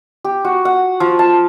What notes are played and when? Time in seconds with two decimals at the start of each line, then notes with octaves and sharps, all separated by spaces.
0.24 G4
0.45 F#4
0.65 F#5
1.00 F3
1.19 A5